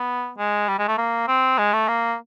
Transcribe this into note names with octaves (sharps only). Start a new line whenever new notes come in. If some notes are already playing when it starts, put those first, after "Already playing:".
Already playing: B3
G#3
G3
G#3
A3
A#3
C4
G#3
A3
A#3